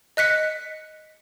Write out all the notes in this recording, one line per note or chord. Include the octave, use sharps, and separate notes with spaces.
D#5 F#6 B6 C#7